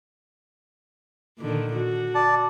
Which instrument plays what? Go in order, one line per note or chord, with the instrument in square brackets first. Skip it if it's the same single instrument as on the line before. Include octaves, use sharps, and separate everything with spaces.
[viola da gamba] A#2 D3 D#3
F#4
[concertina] D5 A5